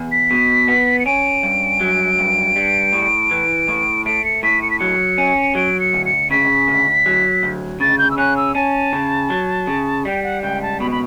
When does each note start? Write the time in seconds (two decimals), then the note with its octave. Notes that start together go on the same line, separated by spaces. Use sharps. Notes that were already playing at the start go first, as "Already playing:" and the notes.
Already playing: E2
0.12 B6
0.31 B2
0.68 B3
0.99 C#7
1.06 C#4 D7
1.43 G2
1.81 F#3
2.19 G2
2.56 G3
2.93 A2
3.31 E3
3.68 A2
4.06 A3 D7
4.25 C#7
4.43 A2 B6
4.62 C#7
4.71 B6
4.79 F#3 C#7
5.18 C#4
5.55 F#3 D7
5.80 C#7
5.93 D2
6.06 C#7
6.30 C#3 B6
6.68 D2
7.06 F#3
7.43 D2
7.80 C#3 A6
7.98 G6
8.11 E6
8.18 C#4 F#6
8.37 E6
8.55 C#4 A5
8.93 C#3
9.30 F#3
9.67 C#3
10.05 G3 G5
10.23 F#5
10.42 C#2 G5
10.62 A5
10.80 B2 B5
10.91 B5